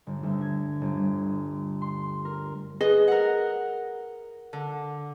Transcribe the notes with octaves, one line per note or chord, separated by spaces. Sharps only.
G1
D2
G#6
G1
C6
A#4
G#4 B4 D#5
A#4 F#5
D3